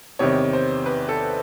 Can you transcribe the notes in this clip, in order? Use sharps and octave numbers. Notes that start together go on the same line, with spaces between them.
E2 C3 D#3 G3 C4 C#5
C5
B4
A4